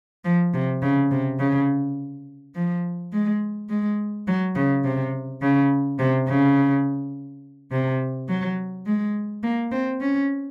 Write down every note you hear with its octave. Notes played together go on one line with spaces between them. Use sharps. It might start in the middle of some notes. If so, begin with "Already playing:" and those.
F3
C3
C#3
C3
C#3
F3
G#3
G#3
F#3
C#3
C3
C#3
C3
C#3
C3
F#3
G#3
A#3
C4
C#4